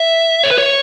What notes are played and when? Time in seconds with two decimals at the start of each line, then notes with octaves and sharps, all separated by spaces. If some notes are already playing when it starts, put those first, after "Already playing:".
Already playing: E5
0.44 C#5
0.51 B4
0.58 C#5